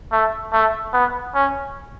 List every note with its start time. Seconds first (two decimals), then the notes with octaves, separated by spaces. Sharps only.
0.12 A3
0.52 A3
0.93 B3
1.35 C#4